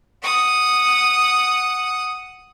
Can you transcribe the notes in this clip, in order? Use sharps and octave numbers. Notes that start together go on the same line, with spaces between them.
F#5 D#6